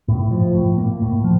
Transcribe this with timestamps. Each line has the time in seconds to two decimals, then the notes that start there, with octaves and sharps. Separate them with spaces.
0.08 A2
0.31 F3
0.55 A2
0.78 A#3
1.02 A2
1.24 F3